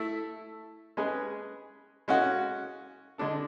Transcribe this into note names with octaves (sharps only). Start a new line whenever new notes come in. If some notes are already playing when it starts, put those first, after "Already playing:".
Already playing: A3 E4 A4
G#3 C#4 G#4 B4
G#3 C#4 F#4
D3 G#3 D4 A4